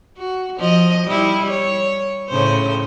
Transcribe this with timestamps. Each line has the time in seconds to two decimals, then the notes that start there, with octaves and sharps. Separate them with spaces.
0.18 F#4
0.59 F3 D#5
1.07 G3 E4
1.51 C#5
2.29 A2 C#3 C5